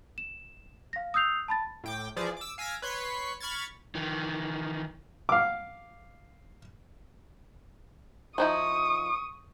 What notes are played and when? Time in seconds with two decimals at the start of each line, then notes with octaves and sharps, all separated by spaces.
0.18 E7
0.93 F5 A#6
1.14 D#6 E6 G6 C7 F7
1.48 A5 B5 A6
1.84 A2 G5 D6
2.16 E3 F3 G#4 D5
2.37 D6 E6
2.58 F5 G#5 E6 A#6 B6 D7
2.82 B4 C#5 C6 B6 C#7
3.40 B5 C#6 F6 G#6 A6
3.95 D#3 E3
5.29 F5 D6
8.38 F3 D#4 E4 C#6 D#6